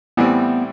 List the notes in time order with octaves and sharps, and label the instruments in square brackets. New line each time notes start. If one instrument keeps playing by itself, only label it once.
[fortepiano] A2 E3 G3 C4 [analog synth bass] B3